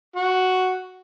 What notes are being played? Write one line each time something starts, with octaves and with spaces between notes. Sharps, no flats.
F#4